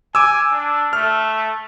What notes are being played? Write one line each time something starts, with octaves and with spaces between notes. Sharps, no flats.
G#5 D6 E6
D4
A3 F6